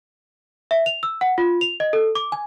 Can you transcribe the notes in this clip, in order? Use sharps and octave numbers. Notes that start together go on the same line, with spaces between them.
E5
F7
E6
F#5
F4
F7
D#5
A4
D6
G#5